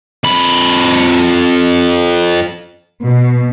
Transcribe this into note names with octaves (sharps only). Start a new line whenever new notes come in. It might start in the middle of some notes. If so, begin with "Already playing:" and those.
F2 B5
B2